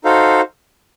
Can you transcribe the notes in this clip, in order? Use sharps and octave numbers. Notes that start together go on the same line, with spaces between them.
D#4 F#4 A4 C5 F5